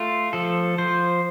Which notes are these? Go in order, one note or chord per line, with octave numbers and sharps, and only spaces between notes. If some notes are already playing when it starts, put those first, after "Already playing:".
Already playing: A3 F4
F3 A4
F3 C5